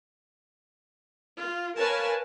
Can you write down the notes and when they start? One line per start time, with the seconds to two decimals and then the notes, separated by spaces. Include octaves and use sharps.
1.42 F4
1.78 A#4 B4 C#5 F5 G#5 A5